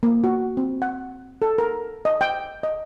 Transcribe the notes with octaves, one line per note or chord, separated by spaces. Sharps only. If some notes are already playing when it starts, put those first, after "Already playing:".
A#3
F#4
C4
F#5
A4
A#4
D#5
G5
D#5